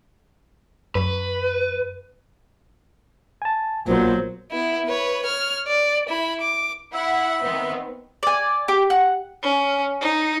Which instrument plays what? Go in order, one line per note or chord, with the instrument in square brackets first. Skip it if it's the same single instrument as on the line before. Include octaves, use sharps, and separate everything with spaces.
[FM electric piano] F#2 [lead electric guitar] B4
[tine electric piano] G#5 A5
[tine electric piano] B1 B3 [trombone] A#2 [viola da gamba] F#3 [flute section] C5
[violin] B3 E4
B4 C#5
C#5 F6
D5
E4 B5
D6
[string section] E4 F#5 [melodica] E5
[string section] D#3 B3 C4
[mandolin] D5 G#5
G4 D6
F#5
[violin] C#4
D#4